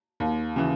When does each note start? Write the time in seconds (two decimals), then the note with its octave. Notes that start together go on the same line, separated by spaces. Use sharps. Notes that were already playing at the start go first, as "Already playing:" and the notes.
0.20 D#2
0.56 C#3 E3